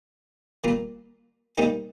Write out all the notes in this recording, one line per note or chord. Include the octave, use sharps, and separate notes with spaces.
A#2 G3 A#3 F4
C3 G3 A#3 D#4 G4